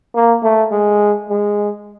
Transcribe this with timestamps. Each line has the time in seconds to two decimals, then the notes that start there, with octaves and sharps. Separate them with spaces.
0.15 A#3
0.43 A3
0.72 G#3
1.30 G#3